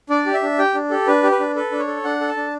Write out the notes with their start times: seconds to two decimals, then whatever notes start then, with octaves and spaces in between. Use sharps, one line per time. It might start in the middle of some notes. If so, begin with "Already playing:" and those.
0.10 D4 D5
0.26 G4
0.34 E5
0.42 D4
0.59 G4 G5
0.74 D4
0.90 G4 A4
1.07 D4 B4
1.23 G4
1.32 B4
1.40 D4
1.56 A4 B4
1.71 D4
1.79 C#5
1.87 A4
2.04 D4 F#5
2.21 A4
2.29 A5
2.37 D4